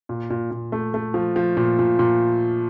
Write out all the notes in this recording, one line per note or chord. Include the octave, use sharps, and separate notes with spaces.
A#2
A#2
A#2
A3
A3
F3
F3
A#2
A#2
A#2